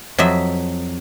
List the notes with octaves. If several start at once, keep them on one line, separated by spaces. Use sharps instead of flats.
F2 F#3 D#5 E5